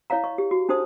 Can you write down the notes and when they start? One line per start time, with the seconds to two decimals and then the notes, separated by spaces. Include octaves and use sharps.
0.10 E4 C#5 D#5 F5 A#5
0.24 D#5 C#6
0.38 G4
0.51 F#4
0.69 D4 D#4 A4 C5 D#6